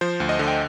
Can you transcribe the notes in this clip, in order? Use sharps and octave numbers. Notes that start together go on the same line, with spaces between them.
F3 C5
D2
D#5
D3
G5